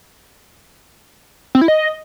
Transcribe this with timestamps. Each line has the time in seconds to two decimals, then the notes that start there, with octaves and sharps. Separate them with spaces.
1.55 C4
1.61 E4
1.68 D#5